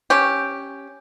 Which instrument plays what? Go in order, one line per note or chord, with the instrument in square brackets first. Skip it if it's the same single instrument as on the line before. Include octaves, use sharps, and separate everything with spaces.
[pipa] C#4 G4